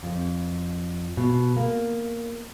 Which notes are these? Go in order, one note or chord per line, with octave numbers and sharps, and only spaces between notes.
F2
B2
A#3